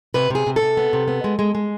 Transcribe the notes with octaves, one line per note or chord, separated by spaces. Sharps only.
C3 B4
C3 G#4
C3
A4
C3
B3
C3
B3
G#3
G#3
G#3